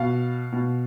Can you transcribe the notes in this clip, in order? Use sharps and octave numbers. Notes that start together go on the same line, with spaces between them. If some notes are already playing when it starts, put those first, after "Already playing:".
Already playing: B2 F5
B2